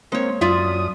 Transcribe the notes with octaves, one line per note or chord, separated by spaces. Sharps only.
G#3 A#3 C4 C#5
F#2 F4 D5 E5 D#6